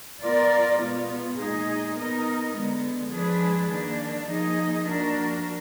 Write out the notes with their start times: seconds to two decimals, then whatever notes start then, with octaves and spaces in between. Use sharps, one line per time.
0.22 B3 F4 A#4 D5
0.81 B2 G#3 B3 F4
1.38 A#2 G#3 D#4 G#4 D#5
1.96 B3 D#4 A#4 D#5
2.54 D3 G#3 B3
3.12 F3 G#3 D4 G#4 B4
3.69 D#3 A#3 D4
4.27 F3 A#3 D#4 G#4 D#5
4.86 F3 A#3 D4 F#4 A#4